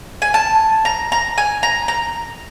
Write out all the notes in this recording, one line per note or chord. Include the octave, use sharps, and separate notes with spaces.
G#5
A5
A#5
A#5
G#5
A#5
A#5